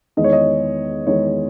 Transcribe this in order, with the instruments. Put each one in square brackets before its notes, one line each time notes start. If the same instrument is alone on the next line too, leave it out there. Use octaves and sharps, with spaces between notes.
[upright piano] E2 D#3 G#3 D#5
C#5
D#5
E2 D#3 G#3 C#5